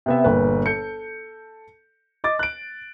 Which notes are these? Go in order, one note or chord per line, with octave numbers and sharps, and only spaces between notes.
C3 B3 E5
G1 A#2 B4
A4 G6 C#7
D#5 D6 A6
F#6 D7